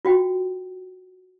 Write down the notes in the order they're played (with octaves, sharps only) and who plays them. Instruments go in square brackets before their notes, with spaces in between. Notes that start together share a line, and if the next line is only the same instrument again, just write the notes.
[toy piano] F4 F#4 G5